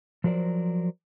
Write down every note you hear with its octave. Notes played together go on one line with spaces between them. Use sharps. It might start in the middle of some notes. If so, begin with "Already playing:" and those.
F3 F#3 A#4 C5 D5